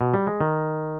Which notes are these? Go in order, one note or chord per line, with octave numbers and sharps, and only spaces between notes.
B2
G3
G#3
D#3